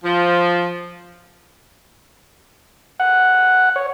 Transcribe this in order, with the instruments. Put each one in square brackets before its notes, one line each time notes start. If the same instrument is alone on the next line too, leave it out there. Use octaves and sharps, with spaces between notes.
[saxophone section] F3
[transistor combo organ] F#5
C#5